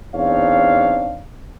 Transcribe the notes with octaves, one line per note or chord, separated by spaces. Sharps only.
E2 C4 D4 D#4 C#5 F5